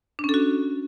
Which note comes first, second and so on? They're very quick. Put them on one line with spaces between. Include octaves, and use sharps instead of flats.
D4 C#4 A4 F#4